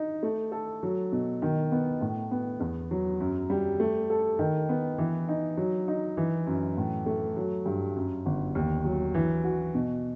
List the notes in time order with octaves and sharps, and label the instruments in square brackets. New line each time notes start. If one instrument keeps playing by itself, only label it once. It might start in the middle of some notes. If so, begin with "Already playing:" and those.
Already playing: [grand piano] D#4
A3
A4
F#3
B2
D#3
B3
A2
B3
E2
F#3
F#2
G3
A3
A4
D#3
B3
E3
D#4
F#3
D#4
E3
F#2
A2
A3
F#3
G2
F#2
G1
D#2
F#3
E3
F#4
B2